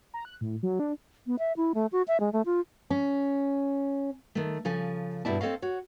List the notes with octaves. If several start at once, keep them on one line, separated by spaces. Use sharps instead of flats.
A#5
F#6
A2
F#3
D4
B3
E5
E4
A3
F#4
E5
G#3
A3
F4
C#4
D#3 A3
C#3 F3 A4 G#5
G2 B2 G3 E4 D5 A5
C4 A4 C#5 D#5 F5
F#4 C#5